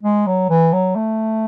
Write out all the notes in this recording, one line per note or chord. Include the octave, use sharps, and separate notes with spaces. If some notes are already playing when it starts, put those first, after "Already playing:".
G#3
F#3
E3
F#3
A3